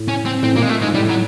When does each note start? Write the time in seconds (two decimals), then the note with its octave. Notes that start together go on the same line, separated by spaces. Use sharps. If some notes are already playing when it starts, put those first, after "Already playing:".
Already playing: A2
0.08 C#4
0.25 C4
0.43 A2 C4
0.56 A#2 A#3
0.62 G#3
0.69 A3
0.82 G#2 G#3
0.94 A2 G3
1.09 F#3